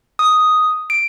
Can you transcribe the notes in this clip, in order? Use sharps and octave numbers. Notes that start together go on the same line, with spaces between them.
D#6
D7